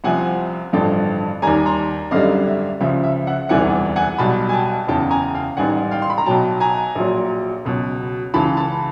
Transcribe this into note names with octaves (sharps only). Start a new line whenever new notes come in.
C2 C3 F3 F#5 G#5
A1 G2 D3 F3 G5 A5
D#2 D#3 G3 G#5 A#5
A#5 C6
G#1 F#2 D3 G3 D#5 F5
E5
C#2 C#3 F3 E5
E5
E5 F#5
E1 D2 C3 E3 G3 F#5 G#5
F#5 G#5
B1 B2 G3 A5 B5
G#5
G5 A5
F#1 E2 C#3 G5 A5
G#5 A#5
F5 G5
A1 G#2 D#3 G3 F#5 G#5
F5 G5
C6
B5
A#5
B1 B2 F#3 G5 A5
G#5 A#5
A#1 A#2 F#3
C#2 B2 F#3
C#2 C#3 E3 A5 B5
A5 B5